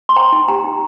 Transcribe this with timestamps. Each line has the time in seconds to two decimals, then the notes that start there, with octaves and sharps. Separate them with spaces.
0.09 C6
0.16 C5 G5 A#5
0.32 D#4
0.48 G4 G5 A#5
0.64 D#4